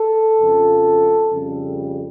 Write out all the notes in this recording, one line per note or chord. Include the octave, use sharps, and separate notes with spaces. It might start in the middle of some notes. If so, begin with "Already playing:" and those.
Already playing: A4
F2 C#3 F3
F2 C#3 G3